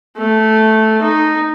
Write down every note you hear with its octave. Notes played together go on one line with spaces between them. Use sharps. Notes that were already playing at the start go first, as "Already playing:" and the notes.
A3
D#4